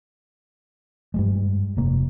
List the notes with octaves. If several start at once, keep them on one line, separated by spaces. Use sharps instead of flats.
G2 G3 G#3
F1 C3 A#3